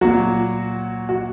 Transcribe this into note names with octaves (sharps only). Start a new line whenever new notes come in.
A#2 F#3 F#4
F#4